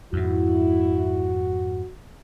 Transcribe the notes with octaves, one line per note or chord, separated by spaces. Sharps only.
F2 G#2 E4 F#4